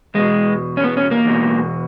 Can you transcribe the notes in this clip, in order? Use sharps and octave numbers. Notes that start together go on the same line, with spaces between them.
E2 B2 G#3
C#4
B3
C#4
A#3
E2 B2